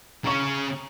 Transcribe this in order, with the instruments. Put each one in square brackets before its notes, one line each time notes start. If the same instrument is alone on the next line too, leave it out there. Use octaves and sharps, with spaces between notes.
[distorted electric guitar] C#3 C#4 [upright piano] A#5 C#6